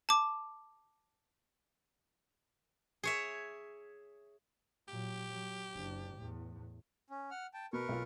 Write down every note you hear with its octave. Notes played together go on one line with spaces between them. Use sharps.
A5 D6
G#4 C#5 E5
A#2 F#3 G4
F#3
F#1 D4
E2 A2
C#4
F#5 F6
G5 A5
B2 A#4 B4 C#6
B1 F4